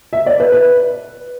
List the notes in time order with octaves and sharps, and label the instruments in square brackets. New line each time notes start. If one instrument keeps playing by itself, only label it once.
[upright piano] E5
D5
B4
B4